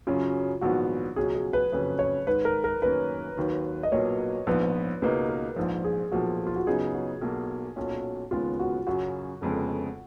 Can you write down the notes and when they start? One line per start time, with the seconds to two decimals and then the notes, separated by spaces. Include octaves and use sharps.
0.07 F#2 C#3 F#3 C#4 F4
0.61 A#1 G#2 D#3 F#3 B3 F#4
1.16 C#2 B2 F#3 C#4 G#4
1.35 G#4
1.53 B4
1.72 F#1 F2 C#3 F#3 C#4 B4
1.99 C#5
2.27 G#2 D#3 G#3 B4
2.45 A#4
2.64 A#4
2.82 F#2 D#3 A#3 C#4 B4
3.37 D#2 D#3 F#3
3.83 D#5
3.92 B1 A#2 F#3 A#3 C#5
4.47 A#1 G#2 F3 B3 B4
5.02 C#2 B2 A#3 D#4 B4
5.30 A#4
5.56 A#1 G#2 F3
5.84 G#4
6.12 B1 A#2 F3 F#4
6.47 F4
6.56 F#4
6.67 F#2 C#3 F#3 B3 D#4 G#4
6.95 F#4
7.21 B1 B2 A#3
7.76 B1 A#2 F#3 C#4
8.31 D#2 C#3 G#3 B3 F4
8.59 F#4
8.87 F#2 C#3 F#3 C#4 F#4
9.41 F1 F2 C#3 G#3 B3